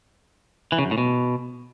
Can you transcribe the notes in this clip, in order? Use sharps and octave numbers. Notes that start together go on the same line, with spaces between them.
E3
C#3
F#2
A2
B2